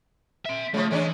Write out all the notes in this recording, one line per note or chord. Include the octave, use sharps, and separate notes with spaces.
E5 C6
C#3 F3 A3
E3 G#3 C#4 D4